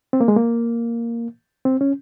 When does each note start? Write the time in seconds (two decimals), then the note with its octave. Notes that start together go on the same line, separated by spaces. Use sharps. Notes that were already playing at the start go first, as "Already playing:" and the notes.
0.13 C4
0.21 A#3
0.28 G#3
0.36 A#3
1.65 C4
1.81 C#4